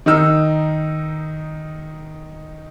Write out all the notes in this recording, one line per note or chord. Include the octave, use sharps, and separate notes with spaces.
D#3 D#4 E6